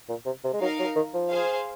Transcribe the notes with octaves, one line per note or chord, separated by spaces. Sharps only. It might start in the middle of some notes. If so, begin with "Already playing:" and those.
A#2
C3
C3
G#3
F#3 D#4 A#4 F5
F#3
D#3
F3
G#4 C5 F5